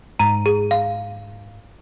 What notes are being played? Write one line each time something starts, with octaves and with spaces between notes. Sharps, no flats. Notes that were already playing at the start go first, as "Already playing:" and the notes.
G#2 A#5
G#4
F5